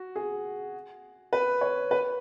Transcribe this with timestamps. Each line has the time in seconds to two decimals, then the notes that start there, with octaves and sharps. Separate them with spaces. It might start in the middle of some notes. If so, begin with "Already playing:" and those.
Already playing: F#4
0.16 G#4
1.33 B4
1.61 C#5
1.91 B4